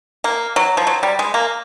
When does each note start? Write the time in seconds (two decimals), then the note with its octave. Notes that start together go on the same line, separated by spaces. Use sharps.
0.24 A#3
0.56 F#3
0.77 F3
0.87 F#3
1.03 G3
1.19 G#3
1.34 A#3